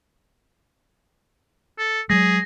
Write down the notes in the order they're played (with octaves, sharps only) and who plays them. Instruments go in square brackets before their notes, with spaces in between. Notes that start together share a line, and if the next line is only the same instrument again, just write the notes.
[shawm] A4
[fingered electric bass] F#3 G#3 [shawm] G#4 [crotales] A#6